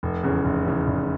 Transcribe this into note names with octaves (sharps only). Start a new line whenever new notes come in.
F1
E2 C#3
F1
E2 C#3
F1